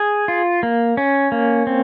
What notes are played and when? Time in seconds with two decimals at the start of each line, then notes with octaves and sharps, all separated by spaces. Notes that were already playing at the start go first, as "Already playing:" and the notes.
Already playing: G#4
0.28 F4
0.63 A#3
0.97 C#4
1.32 A#3
1.67 C4